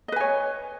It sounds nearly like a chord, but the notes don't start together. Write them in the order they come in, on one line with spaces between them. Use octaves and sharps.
D#5 B4 G#5 C#5